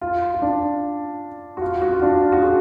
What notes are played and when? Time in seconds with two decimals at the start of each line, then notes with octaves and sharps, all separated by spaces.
0.01 F4
0.34 F4
0.42 D4
1.57 F#4
1.62 F4
1.82 F#4
1.94 F4
2.02 D4
2.22 F4
2.32 F#4
2.42 G#4